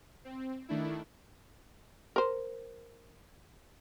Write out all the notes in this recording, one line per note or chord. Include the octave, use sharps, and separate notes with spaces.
C4
D#3 A3 D4 E4
A#4 C5